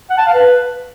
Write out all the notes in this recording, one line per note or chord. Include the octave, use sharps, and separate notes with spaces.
F#5
A5
F5
B4